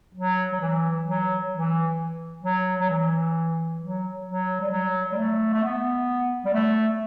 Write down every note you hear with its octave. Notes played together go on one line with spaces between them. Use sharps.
F#3
F#3
E3
F#3
E3
F#3
F#3
E3
F#3
F#3
G3
F#3
G3
A3
A3
B3
G3
A3